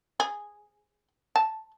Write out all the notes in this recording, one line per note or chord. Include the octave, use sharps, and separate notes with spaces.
G#4
A5